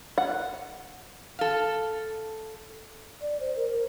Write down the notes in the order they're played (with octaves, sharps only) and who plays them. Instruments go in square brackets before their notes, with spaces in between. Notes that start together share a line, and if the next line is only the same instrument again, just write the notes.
[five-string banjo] F#5
[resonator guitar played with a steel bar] A4 F5
[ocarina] D5
C5
A#4